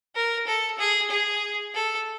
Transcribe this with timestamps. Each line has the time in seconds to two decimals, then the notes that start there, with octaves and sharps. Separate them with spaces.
0.15 A#4
0.47 A4
0.79 G#4
1.10 G#4
1.74 A4